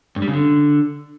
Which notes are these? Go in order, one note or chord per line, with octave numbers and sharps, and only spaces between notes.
G2
G3
C#3
D3